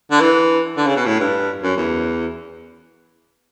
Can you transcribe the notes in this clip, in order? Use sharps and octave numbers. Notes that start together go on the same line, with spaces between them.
D3
E3
D3
C#3
B2
A2
G2
F#2
E2